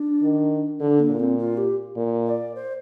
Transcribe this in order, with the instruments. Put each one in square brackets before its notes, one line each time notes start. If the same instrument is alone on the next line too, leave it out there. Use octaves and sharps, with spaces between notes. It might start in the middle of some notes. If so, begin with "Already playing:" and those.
Already playing: [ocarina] D4
[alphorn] D#3
[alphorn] D3 [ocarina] D4
[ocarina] A#3
[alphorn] A#2
[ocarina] C4
F4
G4
[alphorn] A#2
[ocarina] D5
C5